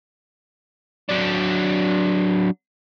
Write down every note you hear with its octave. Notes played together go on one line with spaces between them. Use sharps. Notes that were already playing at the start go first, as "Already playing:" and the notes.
F#3 D4